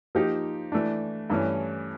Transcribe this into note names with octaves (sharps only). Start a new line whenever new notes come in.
F3 A#3 D#4 G4
E3 A3 D4
G2 E3 A3 C#4